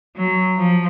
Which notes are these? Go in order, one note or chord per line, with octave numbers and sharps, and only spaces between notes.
F#3
F3